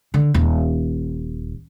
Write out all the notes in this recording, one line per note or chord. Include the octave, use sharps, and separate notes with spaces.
D3
D#1